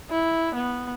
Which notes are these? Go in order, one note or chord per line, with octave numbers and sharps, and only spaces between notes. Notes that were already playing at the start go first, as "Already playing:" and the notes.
E4
B3